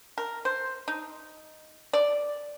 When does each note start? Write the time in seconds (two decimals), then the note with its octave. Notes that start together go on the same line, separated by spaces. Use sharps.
0.18 A#4
0.45 C5
0.88 D#4
1.93 D5